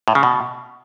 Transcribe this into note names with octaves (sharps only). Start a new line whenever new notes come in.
A2
C#3
B2